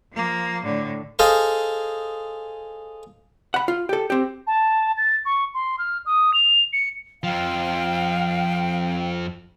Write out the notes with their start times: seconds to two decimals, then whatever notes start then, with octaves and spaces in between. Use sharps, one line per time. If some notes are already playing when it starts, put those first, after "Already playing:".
0.12 F3 A#3
0.63 A2 D3
1.19 G#4 A4 C5 D#5 F5
3.54 F#5 B5
3.68 F4
3.89 G4 A4
4.10 C4 G4
4.47 A5
4.97 A6
5.25 C#6
5.54 C6
5.78 F6
6.06 D#6
6.33 F7
6.73 C#7
7.24 F2 F3 F5 G5